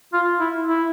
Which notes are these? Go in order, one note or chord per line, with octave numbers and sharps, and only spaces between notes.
F4
E4
E4